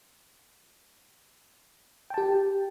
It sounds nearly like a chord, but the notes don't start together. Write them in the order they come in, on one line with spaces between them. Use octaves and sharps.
G5 A5 G4